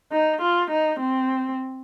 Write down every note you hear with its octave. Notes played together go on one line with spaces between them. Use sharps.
D#4
F4
D#4
C4